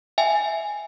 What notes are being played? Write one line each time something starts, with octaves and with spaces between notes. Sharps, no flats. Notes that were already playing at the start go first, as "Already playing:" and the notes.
E5 G5 G#5